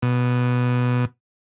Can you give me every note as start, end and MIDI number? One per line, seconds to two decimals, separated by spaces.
0.02 1.05 47